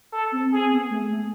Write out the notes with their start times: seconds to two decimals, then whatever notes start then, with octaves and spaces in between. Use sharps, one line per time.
0.13 A4
0.32 C4
0.52 C4 G#4
0.71 B3
0.90 A3
1.08 A3